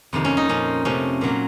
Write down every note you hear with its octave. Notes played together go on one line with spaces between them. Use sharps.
F2 C3 D#3 A#3
C#4
D#4
A#2 F3 A#3 C#4
C3 F3 A3 C#4
A#2 F#3 A#3